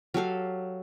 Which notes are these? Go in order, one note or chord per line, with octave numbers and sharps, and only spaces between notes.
F#3 G4 A4 F5